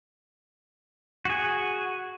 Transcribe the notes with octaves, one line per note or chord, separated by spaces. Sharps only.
F#4 G#4